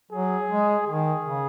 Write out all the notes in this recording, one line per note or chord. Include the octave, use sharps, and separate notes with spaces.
F#3 G#4
G#3
D#3 G#4
C#3